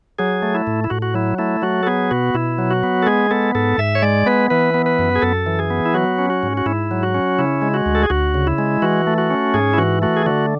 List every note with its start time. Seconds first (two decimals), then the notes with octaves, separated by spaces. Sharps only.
0.19 F#3 G#4
0.42 A3
0.55 E4
0.67 A2
0.84 E4
0.90 A2 F#4
1.02 F#4
1.14 F#3 E4
1.38 A3 E4
1.62 F#3 F#4
1.83 A4
1.87 B3 G#4
2.11 B2 F#4
2.34 B2 E4
2.58 F#3
2.71 F#4
2.83 B3
3.02 A4
3.06 G#3 G#4
3.31 B3 A4
3.55 G#2 A4
3.78 G#2 E5
3.95 C#5
4.02 G#3 D5
4.26 B3 B4
4.50 E3 B4
4.74 B3
4.86 B4
4.99 F#2
5.16 G#4
5.22 F#2 A4
5.46 E3
5.59 G#4
5.70 B3
5.86 E4
5.94 F#3 F#4
6.18 C#4
6.30 F#4
6.43 G#2
6.57 F#4
6.66 G#2 E4
6.91 F#3
7.03 F#4
7.14 C#4
7.39 C#3 E4
7.62 G#3
7.74 F#4
7.86 D2
7.95 A4
8.03 G#4
8.10 D2 F#4
8.34 C#3
8.47 E4
8.58 G#3
8.82 E3 F#4
9.07 A3
9.18 F#4
9.30 C#4
9.54 G#2 G#4
9.73 E4
9.78 E3 F#4
10.02 A3 F#4
10.17 G#4
10.26 D3 F#4